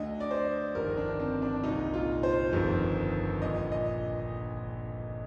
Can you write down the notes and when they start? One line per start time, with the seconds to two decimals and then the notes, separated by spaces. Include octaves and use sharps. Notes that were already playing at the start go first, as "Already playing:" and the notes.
Already playing: D2 D3 D#5
0.20 D5
0.31 C5
0.75 G1 F2 D#3 A#4
0.97 D4
1.20 C4
1.42 D4
1.64 C2 A#2 D#4
1.94 F4
2.23 C5
2.53 G1 F2 D#3
3.42 A#1 A#2 D#5
3.72 D#5